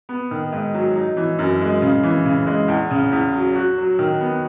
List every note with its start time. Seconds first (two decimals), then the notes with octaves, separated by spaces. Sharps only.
0.09 B3
0.31 D#3
0.52 G#2
0.74 F#3
0.96 D#4
1.17 E3
1.39 F#2
1.61 G#3
1.82 C#3
2.04 E3
2.25 C#3
2.47 G#3
2.68 E2
2.91 C#3
3.12 E2
3.34 F#3
3.55 F#4
3.78 F#3
3.99 D#3
4.20 B3